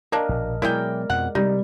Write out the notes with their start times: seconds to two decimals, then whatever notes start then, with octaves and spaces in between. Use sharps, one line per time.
0.12 A#3 D4 A#4 D#5
0.29 A#1 B2
0.62 B2 F#3 G#3 E4 G#4 A#4 D5 G5
1.10 F2 B2 F3 F#5
1.35 C3 G3 D#4